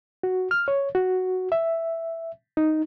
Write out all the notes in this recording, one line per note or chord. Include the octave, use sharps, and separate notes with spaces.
F#4
F6
C#5
F#4
E5
D#4